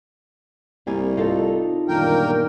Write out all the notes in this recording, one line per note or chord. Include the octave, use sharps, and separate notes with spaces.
C2 G3 A#3 G#5
D#4 F4 A4
G1 F#2 A#2 D#3 A#3 A#4 G5